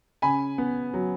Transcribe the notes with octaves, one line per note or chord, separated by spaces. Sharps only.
C#3 G#5 B5
B3
F#3